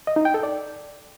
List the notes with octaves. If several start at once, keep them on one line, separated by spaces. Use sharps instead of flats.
D#5
D#4
G5
A4
D5